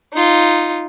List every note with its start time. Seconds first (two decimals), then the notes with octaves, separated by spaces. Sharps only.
0.14 D#4 F4